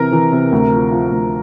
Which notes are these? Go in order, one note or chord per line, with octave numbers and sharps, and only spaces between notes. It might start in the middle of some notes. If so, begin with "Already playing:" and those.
Already playing: C3 E3 A#4 A#5
E3
C3
D2
F3
F3
D2